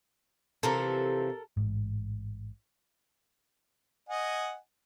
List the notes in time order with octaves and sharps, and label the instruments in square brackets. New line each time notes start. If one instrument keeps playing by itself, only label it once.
[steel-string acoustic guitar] C3 E3 F3 [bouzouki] A4 A#4
[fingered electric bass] A1 G#2
[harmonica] D#5 F#5 G#5